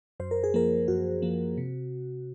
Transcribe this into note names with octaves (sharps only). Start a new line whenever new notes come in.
F#2 C5
A#4
G#4
F3 A#3 A#4
F#2 F#4
F3 A#3
C3